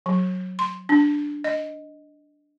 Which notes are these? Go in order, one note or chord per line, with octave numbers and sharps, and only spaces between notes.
F#3
C6
D4
D#5